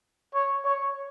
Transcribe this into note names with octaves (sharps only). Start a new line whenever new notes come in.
C#5
C#5